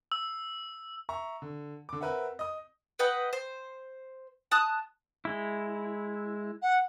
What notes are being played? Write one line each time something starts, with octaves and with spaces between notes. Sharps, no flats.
E6
E5 A#5 C#6
D3
D3 D6
C4 A#4 B4 E5 F#5
D#5 D#6
B4 D#5 F#5 G5
C5
A5 D#6 F#6
G#3 E4
F#5